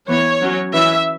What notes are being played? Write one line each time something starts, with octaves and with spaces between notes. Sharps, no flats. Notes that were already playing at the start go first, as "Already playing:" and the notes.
E3 B3 C#5
F#3 C#4
E3 C#4 E5